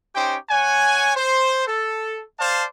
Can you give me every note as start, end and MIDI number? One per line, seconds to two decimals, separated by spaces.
0.15 0.36 61
0.15 0.36 63
0.15 0.36 67
0.15 0.36 72
0.15 0.36 79
0.49 1.11 73
0.49 1.11 78
0.49 1.11 80
1.16 1.64 72
1.67 2.21 69
2.39 2.64 72
2.39 2.64 74
2.39 2.64 77
2.39 2.64 81